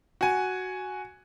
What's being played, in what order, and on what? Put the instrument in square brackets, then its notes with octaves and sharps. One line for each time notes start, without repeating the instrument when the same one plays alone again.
[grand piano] F#4 G#5